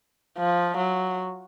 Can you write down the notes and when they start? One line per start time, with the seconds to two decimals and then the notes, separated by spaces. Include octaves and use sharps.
0.38 F3
0.77 F#3